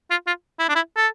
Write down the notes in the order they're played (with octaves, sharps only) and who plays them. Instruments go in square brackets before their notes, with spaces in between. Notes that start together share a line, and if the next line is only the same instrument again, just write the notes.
[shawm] F4
F4
E4
D4
E4
A4